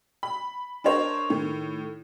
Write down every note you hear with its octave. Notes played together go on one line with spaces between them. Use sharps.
B5
D4 A#4 C5 C#5 D#5
A2 D#3